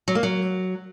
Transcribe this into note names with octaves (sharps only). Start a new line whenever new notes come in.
F#3
A#3
F#3